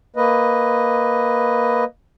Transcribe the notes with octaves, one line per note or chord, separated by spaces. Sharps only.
A#3 B4 D#5